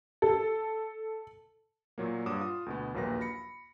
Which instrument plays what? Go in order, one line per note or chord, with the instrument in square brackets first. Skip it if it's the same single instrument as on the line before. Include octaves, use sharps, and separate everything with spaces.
[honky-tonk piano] A4
[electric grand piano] A#2 F#3 A#3
G2 C#5 F#5 D6 D#6 E7
F4 F5 D#6
D2 B2 B3
A#1 D#2 F#3 A#3 B4 A#6
B5 A#6 C#7